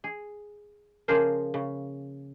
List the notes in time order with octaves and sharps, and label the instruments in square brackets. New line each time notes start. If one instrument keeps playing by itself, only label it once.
[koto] G#4
C#3 F3 A#3 G#4 A#4 C5
C#3